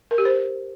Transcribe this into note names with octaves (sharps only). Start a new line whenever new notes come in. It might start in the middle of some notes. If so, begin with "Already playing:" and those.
A#4
G4
C5